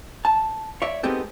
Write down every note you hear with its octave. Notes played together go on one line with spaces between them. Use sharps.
A5
C#5 D5 E5
G#3 B3 C4 D#4 G4 A4